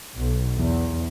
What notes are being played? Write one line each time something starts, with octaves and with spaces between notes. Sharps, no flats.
B1
E2